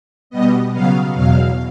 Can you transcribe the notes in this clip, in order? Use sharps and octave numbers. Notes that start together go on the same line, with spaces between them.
B2 G3 B3 D#5
C#3 F#3 B3 F5
E2 B2 F#3 F5